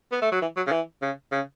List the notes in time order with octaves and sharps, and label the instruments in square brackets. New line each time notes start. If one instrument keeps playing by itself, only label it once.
[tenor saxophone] B3
A3
F#3
E3
F#3
C#3
E3
C#3
C#3